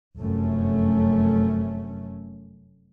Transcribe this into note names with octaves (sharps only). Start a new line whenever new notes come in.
F1 F#2 A3 C#4